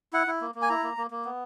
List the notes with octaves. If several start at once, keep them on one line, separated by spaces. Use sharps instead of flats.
E4 F#5
E4
A#3
A#3
G#5
E4 A#5
A#3
A#3
A#3
B3